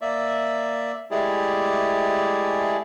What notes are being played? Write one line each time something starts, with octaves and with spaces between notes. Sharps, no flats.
A#3 D5 E5
G#3 A3 E4 G4 G#4 D5